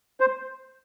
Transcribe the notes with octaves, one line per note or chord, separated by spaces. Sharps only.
C5